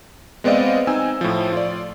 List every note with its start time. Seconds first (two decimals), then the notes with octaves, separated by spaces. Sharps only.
0.44 G#3 B3 C4 D5 D#5 F5
0.87 C4 D#4 G#5 E6
1.21 A2 F3
1.53 F4 D5